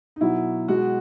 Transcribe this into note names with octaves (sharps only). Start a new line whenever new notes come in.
D#4
B2 F#3 E4
B2 G#3 F#4